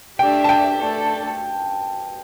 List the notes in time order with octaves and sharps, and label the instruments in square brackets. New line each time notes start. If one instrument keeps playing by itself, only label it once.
[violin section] A3 D4 G4 E5 [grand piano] G5
[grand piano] A5
G5
[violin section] A3 D4 A4